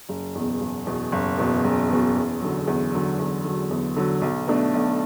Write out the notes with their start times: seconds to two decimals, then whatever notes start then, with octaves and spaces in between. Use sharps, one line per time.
0.09 F#1
0.35 E2 B2
0.61 F#1
0.87 E2 B2
1.12 F#1
1.38 E2 B2
1.64 F#1
1.90 E2 B2
2.16 E2
2.41 D3 F#3
2.67 E2
2.93 D3 F#3
3.19 E2
3.44 D3 F#3
3.71 E2
3.96 D3 F#3
4.22 B1
4.48 B2 A3 D4
4.74 B1